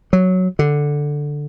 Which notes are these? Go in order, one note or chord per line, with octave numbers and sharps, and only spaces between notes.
F#3
D3